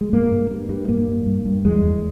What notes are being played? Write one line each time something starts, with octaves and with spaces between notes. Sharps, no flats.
G#3
G2 A#3
G2
G2
G2
G2 A#3
G2
G2
G2
E2 G#3
E2